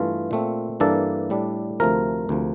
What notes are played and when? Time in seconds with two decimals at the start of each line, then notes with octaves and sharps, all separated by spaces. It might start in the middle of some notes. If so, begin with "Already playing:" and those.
Already playing: G2 E3 A3 F4
0.31 A#2 A3 C4
0.80 G2 E3 A#3 D4 A4
1.30 A2 G3 D4
1.80 D2 C3 F3 A3 A#4
2.29 D2 C3 F3